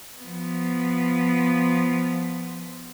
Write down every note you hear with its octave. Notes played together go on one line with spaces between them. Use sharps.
F3 B3